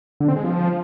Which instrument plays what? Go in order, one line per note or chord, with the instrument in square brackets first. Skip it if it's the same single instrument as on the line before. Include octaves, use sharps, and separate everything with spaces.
[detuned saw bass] D3
C4
G#3
F3